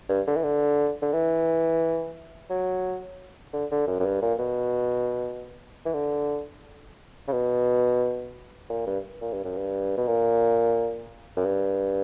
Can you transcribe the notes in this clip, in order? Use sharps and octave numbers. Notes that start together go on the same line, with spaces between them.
G2
D3
E3
D3
D3
E3
F#3
D3
D3
F#2
F#2
G2
A#2
B2
E3
D3
C#3
B2
A#2
G2
A#2
G2
F#2
G2
B2
A#2
F#2
G2